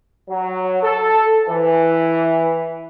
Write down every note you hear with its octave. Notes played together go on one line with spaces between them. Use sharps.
F#3
A4
E3